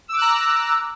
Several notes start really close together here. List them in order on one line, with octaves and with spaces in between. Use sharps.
E6 D6 F#6 A#5